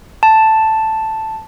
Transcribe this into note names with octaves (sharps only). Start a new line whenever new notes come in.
A5